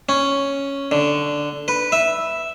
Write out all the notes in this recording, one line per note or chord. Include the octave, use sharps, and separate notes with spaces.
C#4
D3
B4
E5